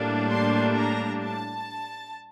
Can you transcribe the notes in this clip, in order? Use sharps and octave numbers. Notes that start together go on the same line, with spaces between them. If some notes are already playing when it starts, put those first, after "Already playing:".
Already playing: A2 G3 A#3 D4
C6
A#5
A5